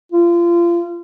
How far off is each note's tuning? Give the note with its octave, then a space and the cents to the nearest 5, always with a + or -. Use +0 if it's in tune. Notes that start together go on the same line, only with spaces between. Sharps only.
F4 -30